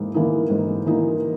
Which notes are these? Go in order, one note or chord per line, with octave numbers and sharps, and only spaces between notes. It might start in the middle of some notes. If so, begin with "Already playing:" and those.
Already playing: G#2 E3 A#3 D#4
E3 A#3 D#4
G#2
E3 A#3 D#4